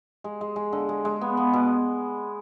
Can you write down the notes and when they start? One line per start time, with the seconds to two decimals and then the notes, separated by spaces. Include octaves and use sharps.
0.24 G#3
0.41 G#3
0.56 G#3
0.73 D3
0.89 G#3
1.05 G#3
1.21 B3
1.37 B3
1.54 B2